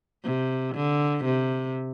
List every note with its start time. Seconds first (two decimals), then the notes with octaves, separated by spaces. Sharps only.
0.24 C3
0.75 D3
1.24 C3